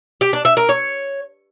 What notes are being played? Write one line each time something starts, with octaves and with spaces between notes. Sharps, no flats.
G4
D4
E5
A#4
C#5